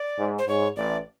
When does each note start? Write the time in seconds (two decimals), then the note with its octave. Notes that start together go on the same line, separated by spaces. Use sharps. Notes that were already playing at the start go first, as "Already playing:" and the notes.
Already playing: D5
0.19 G#2
0.38 C5
0.48 G#2 C#5
0.76 A1 A2 D5